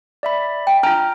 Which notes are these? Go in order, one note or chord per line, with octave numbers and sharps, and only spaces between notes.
D5 E5 B5
G5
D4 F4 G5 A#5 F6